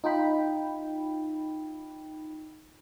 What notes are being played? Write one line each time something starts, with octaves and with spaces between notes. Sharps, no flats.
D#4 F4 G5 B5